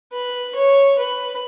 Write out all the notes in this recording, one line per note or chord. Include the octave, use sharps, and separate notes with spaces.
B4
C#5
B4